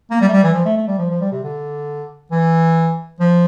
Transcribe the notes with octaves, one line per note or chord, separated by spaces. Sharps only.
A#3
G3
A3
G3
E3
F3
A3
A3
G3
F3
F3
G3
C3
D3
E3
F3